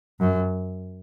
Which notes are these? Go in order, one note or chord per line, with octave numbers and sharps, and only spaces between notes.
F#2